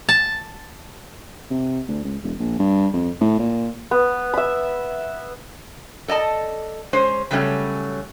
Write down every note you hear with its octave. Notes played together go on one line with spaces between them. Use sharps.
A5
C3
D2
C#2
E1
A#1
G2
F2
A2
A#2
B3
E5 B5
A4 D5 D#5 A5
G#3 C#4 C5
C#3 F#3 G3 A3 C#4